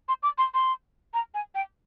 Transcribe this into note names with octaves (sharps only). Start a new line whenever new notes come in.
C6
D6
C6
C6
A#5
G#5
G5